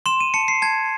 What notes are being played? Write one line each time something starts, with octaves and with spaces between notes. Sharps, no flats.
C6 E7
D#7
A5 C#7
C7
A5 G#6